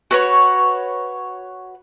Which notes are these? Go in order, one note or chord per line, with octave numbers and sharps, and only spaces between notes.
F#4 B4 C#5